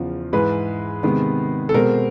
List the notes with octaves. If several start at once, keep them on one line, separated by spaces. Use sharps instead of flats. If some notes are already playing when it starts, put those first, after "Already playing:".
Already playing: E2 C#3 F3
G#2 E3 G#3 B4
C3 D#3 G#3 B3
A4
B2 G#3 C4 A#4